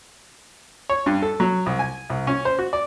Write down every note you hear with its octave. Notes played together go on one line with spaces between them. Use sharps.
C#5
G2
A4
F#3
C2
G#5
C2
C#4
C5
F#4
D5